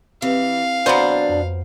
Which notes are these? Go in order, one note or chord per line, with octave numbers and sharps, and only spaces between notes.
E3 C4 G4 B4 F5
E2 B2 F#3 B3 D4 C5
F2